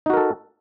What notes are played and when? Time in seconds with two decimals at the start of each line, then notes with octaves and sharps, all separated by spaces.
0.06 D#4
0.10 F#4
0.13 A#4
0.17 A4